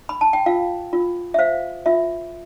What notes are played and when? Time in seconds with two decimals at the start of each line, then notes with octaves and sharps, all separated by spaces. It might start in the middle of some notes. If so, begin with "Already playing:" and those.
0.09 B5
0.21 A5
0.33 G5
0.46 F4 F5
0.93 F4
1.34 E5
1.39 C5 F5
1.86 F4 E5